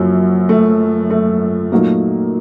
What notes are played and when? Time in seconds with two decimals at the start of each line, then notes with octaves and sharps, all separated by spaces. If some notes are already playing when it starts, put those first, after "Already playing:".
Already playing: F#1 F#2 F3 F#3
0.49 A3
1.10 A3
1.72 A#2 F#3 A3 A#3 D#4 A#4